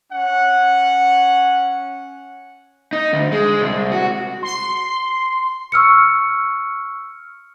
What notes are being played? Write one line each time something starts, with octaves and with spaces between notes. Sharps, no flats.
C#4 F#5
D#4
D2
G#3
C2
F#4
C6
C#6 E6 F6 C#7